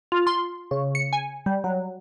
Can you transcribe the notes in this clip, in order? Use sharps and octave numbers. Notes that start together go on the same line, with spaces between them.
F4
C6
C#3
C#7
G#5
G3
F#3